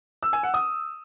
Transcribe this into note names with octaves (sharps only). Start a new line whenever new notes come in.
E6
G#5
F#5
D#6